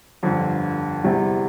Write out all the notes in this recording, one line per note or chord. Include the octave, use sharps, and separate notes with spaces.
G1 F2 D3
E2 C3 G3